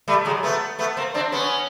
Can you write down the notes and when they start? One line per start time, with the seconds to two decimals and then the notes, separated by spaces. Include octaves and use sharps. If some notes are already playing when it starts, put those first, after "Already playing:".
0.08 G3 A3
0.25 F#3 G#3
0.43 A3 B3
0.79 A3 B3
0.97 A#3 C4
1.14 C4 D4
1.32 B3 C#4